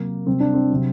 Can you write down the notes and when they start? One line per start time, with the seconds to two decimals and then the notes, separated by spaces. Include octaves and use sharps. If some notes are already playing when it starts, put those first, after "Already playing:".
Already playing: C3 F#3 A#3
0.26 C3 G3 C4
0.40 D4
0.54 C4
0.70 C3 F#3